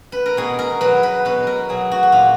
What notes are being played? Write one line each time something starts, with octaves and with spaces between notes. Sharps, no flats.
B4
A#4
B2 G#4
A#4
F#3 B4
B4
B2 B4
A#4
F#3 G#4
F#4
F#4
A#2 F4